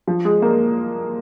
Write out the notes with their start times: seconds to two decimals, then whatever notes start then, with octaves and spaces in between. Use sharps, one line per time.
0.07 F3
0.25 G#3
0.42 A#3